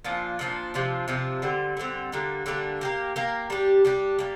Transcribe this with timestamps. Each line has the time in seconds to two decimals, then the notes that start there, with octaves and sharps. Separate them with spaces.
0.05 A#2 F3 D4
0.39 A#2 F3 D4
0.74 C3 F3 D4 F4
1.08 C3 F3 D4 F4
1.42 D3 G3 C4
1.77 D3 G3 C4
2.12 D3 G3 A#3 D4
2.46 D3 G3 A#3 D4
2.81 A#3 G4 A#4
3.16 A#3 G4 A#4
3.50 G3 D4 G4
3.85 G3 D4 G4
4.19 G3 A#3